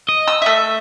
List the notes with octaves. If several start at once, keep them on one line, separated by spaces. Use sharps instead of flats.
D#5
E6
A3 E5